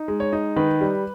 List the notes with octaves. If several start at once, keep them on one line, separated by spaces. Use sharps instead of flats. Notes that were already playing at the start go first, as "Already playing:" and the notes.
Already playing: D#4
G#3
C#5
D#4
D#3 B4
G3